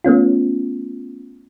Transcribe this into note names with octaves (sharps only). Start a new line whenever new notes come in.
A3 B3 C#4 F4